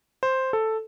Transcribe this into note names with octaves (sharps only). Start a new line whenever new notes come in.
C5
A4